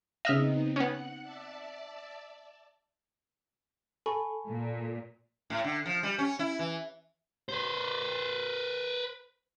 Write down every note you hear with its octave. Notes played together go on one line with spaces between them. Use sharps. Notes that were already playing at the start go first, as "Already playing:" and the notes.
C#3 B3 C4 D#4 D#5 E5 F6
B3 C#4 F#5 F#6 C#7
D5 E5 A5
A4 G#5 B5 C#6
A#2
A2
D3
F3
G3
C#4
E4
E3
B4 C5